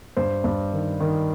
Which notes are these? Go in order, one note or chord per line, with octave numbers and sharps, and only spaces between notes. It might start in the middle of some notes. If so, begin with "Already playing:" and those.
G2 C5
G2
D#3
D#3